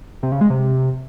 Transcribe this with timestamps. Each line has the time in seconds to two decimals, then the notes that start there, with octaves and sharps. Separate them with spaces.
0.23 C3
0.32 C#3
0.41 G#3
0.50 C3